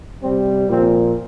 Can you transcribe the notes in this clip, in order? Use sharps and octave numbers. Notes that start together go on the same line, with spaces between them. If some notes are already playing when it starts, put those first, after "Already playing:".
C3 G3 C4
A#2 F3 C4